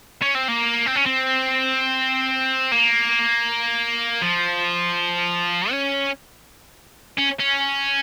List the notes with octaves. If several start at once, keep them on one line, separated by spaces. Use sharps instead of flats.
C#4
C4
A#3
C4
C#4
C4
A#3
F3
C#4
C#4
C#4